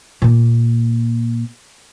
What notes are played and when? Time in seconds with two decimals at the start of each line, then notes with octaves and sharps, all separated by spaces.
0.22 A#2 A#3